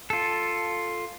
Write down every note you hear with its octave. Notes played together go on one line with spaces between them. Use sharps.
F4 A4